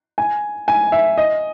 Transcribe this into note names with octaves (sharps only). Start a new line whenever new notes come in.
G#5
G#5
E5
D#5